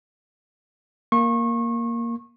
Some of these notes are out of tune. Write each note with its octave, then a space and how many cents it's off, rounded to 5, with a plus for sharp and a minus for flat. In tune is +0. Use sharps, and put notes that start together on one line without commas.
A#3 +0 C#6 -30